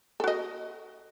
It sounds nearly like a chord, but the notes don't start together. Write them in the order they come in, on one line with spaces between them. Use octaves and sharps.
A4 F#4 D#5